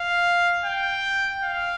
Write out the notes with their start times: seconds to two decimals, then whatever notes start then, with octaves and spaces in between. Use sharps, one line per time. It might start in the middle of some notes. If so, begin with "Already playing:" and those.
Already playing: F5
0.65 G5
1.44 F5